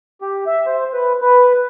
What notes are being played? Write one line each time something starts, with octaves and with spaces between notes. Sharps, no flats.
G4
E5
C5
B4
B4